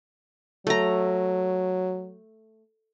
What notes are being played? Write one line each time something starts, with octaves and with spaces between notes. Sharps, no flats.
F#3 A3 A#5